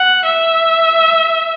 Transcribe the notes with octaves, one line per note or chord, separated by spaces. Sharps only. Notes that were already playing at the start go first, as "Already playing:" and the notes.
Already playing: F#5
E5